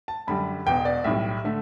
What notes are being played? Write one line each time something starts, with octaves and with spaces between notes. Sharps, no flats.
A5
F#2 D3 G3 B5
E1 E2 B2 G5
D5
B1 A2 G3 E5
D3 A3